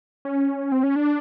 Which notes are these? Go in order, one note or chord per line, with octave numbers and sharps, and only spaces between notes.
C#4
C4
C#4
D4